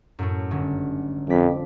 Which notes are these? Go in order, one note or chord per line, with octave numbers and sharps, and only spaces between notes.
F#2 A2 A3
G1 D3 C#4
F2 D5 B6